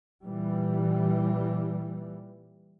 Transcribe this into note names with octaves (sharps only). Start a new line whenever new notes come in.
A#2 E3 G3